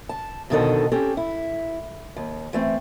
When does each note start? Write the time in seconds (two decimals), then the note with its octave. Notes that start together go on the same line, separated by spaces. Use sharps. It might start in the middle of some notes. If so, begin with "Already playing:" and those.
0.09 A5
0.50 F2 B2 D3 D#3 A4 D#5
0.92 C4 C#4 G4 A4
1.17 E4
2.16 D#2
2.53 E3 A3 C4